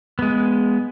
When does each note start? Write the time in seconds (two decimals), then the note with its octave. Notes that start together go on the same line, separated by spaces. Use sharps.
0.19 G#3 B3